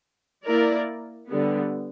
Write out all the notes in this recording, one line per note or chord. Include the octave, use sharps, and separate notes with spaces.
A#3 E4 A#4 D5
D3 G3 B3